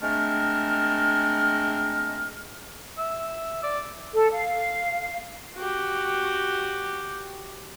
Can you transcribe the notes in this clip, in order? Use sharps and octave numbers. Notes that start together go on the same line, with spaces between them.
G#3 A3 C4 D4 A#4 F6
E5
D5
A4
F5
F#4 G4